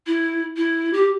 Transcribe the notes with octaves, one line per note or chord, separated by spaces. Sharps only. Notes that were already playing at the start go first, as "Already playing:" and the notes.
E4
E4
G4